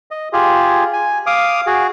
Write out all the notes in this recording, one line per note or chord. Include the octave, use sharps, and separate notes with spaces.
D#5
F4 G4 G#4
G#5
F5 D6 D#6
F#4 G#4